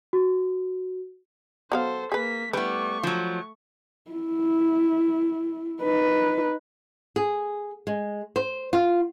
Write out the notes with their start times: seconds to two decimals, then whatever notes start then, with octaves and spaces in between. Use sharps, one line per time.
0.13 F#4
1.72 F#3 B3 A4 C5 F5
2.12 A#3 G#4 B4 B6
2.53 G3 A3 B3 E4 B4 C#6
3.03 F3 F#3
4.11 E4
5.82 D#4 B4
7.16 G#4
7.87 G#3
8.36 C5
8.73 F4